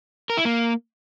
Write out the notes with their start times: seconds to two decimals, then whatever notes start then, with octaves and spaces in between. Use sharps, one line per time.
0.30 A#4
0.37 E4
0.45 A#3